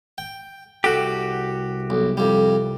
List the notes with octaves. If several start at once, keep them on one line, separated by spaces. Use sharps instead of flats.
G5
C2 F#4 G4 A4
B1
F2 G3